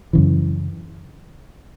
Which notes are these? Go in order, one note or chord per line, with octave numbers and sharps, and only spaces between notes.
F#2 C#3 E3